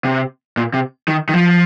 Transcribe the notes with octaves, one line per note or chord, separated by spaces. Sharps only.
C3
A#2
C3
D#3
D#3
F3